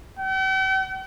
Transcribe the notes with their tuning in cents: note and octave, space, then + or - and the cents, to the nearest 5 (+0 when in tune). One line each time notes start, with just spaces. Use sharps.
G5 -45